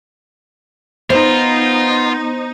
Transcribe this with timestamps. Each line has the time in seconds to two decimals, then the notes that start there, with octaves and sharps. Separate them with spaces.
1.10 B3 D#4 F4 C5